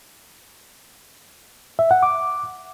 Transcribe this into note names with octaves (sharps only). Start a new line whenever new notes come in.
E5
F#5
D6